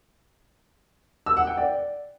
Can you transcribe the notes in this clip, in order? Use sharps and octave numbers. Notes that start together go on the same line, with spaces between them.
E6
F#5
G5
D5